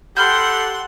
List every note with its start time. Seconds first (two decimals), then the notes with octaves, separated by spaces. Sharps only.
0.17 G4 A4 F#5 B5 C6 F6 G6